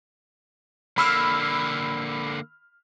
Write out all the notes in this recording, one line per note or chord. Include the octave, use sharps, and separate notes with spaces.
D3 A#3 B5 E6 F6